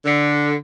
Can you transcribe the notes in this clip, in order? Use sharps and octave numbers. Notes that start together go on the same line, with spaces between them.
D3